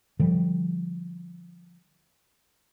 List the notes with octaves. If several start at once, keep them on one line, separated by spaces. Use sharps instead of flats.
D3 F3 G3